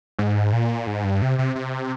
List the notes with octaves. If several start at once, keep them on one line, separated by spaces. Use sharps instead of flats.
G#2
A#2
G#2
G2
C3
C3
C3